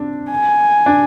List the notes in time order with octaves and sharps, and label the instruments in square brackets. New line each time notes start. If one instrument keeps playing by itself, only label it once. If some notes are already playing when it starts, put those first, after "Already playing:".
Already playing: [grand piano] C4 D4
[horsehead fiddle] G#5
[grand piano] D4